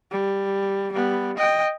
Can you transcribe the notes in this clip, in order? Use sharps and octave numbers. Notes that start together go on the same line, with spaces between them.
G3
G3 B3
D#5 G5